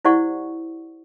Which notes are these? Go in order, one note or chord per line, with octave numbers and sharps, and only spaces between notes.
E4 G4 C5 D5 F#5 C#6